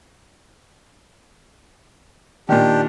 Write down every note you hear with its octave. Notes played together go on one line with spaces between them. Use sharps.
A#2 D#3 D4 G4